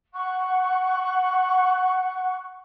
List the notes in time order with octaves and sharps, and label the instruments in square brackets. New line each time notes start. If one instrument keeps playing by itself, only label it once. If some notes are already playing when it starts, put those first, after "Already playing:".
[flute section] F#5 C#6 F#6